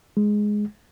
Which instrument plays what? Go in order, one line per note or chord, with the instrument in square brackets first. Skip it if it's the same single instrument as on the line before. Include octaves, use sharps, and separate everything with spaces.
[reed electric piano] G#3